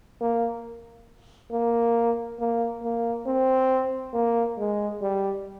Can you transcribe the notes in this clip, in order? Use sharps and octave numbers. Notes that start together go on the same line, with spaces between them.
A#3
A#3
A#3
A#3
C4
A#3
G#3
G3